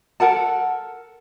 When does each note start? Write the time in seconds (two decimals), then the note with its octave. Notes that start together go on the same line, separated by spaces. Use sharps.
0.20 A4 A#4 F#5 A5